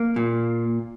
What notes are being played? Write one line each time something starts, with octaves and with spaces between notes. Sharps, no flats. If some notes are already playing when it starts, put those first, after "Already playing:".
Already playing: A#3
A#2